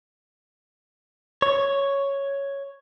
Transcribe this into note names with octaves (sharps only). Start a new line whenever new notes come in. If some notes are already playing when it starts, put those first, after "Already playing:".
C#5